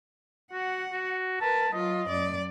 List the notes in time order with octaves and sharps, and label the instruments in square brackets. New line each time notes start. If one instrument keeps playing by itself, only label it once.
[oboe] F#4 [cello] F#5
[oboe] F#4
[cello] A#4 B4 [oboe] A5
[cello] F#3 F4 [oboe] D#5
[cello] F#2 D5